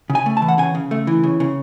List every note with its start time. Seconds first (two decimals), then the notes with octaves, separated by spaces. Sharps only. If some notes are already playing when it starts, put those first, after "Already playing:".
0.10 C#3
0.15 G#5
0.26 A3
0.37 A5
0.42 E3
0.48 F#5
0.58 C#3 G#5
0.75 C#3
0.91 A3
1.07 E3
1.24 C#3
1.40 C#3